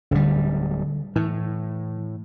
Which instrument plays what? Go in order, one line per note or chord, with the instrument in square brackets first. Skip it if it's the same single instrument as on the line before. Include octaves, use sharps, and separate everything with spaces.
[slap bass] D1 G3 [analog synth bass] D3
[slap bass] A2 [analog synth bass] E3